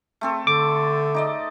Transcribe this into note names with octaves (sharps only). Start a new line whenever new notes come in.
A3 C4 A4
D3 D6
D#4 D5 D#5